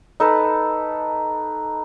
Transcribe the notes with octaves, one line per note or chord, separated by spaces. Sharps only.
D#4 A4 B4